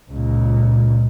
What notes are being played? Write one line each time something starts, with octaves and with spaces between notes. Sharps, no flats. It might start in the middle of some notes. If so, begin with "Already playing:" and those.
C#2 A#2